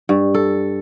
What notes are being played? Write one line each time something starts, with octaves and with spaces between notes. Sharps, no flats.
G2
A4